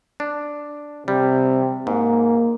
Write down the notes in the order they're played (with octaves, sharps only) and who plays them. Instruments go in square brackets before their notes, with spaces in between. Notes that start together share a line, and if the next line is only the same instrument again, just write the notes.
[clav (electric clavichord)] D4
[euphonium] C3 [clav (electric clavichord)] G3
[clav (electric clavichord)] G#2 [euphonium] A#3